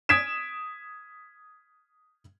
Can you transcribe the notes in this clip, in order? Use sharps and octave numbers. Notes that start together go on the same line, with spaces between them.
D#6 G#6 B6 D7 E7